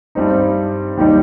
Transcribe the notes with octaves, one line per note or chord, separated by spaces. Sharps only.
G2 G3 C4 D#4
D#2 D#3 G3 D#4